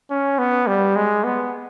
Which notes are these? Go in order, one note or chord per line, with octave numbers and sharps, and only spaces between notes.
C#4
B3
G3
G#3
B3